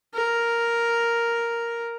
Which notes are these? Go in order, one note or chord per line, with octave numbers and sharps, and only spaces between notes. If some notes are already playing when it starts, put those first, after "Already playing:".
A#4